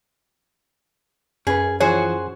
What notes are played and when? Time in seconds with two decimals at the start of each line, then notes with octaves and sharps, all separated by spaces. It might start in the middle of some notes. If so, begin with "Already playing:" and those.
1.47 F#2 C#4 G#4 B4
1.80 E3 F3 F#4 G#4 C5 C#5